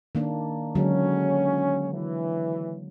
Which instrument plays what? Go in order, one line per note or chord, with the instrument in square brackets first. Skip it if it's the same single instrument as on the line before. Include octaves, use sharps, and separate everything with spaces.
[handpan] D#3 A#3 D4
[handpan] D3 F#3 G#3 [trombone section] C#4
[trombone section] E3